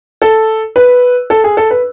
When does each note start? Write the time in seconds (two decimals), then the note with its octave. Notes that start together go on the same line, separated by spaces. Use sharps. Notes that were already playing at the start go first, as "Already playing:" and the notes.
0.22 A4
0.76 B4
1.30 A4
1.44 G#4
1.57 A4
1.71 B4